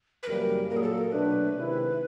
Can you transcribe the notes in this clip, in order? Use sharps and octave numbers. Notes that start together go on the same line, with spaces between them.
B4
F#2 C#3 E3 G3 A#3 A#4
A#2 F#3 A#3 A#4
G#4
A4
A#4
B2 F#3 A3 D4 B4
C3 D#3 G#3 C4 E4